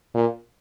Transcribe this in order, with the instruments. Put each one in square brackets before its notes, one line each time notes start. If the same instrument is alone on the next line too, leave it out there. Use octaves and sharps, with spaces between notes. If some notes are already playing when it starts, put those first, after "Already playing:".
[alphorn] A#2